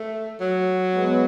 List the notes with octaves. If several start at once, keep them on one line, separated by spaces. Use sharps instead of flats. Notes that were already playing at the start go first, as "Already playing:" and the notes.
Already playing: A3
F#3
G#3 B3